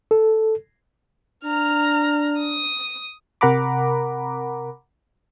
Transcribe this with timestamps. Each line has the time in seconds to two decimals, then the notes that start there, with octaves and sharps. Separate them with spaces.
0.11 A4
1.45 D4 A#5 F6
2.39 D#6
3.41 C3 A#4 F#5 A#5 B5 D6